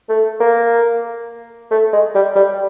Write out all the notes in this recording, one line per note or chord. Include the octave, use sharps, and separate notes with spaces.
A3
A#3
A3
G#3
G3
G3